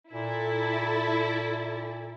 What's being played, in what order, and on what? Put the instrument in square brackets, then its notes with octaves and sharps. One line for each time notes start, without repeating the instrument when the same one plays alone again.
[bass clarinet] A#2 [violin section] E4 A4